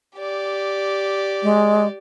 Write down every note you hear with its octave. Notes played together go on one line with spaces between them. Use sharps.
G4 D5
G#3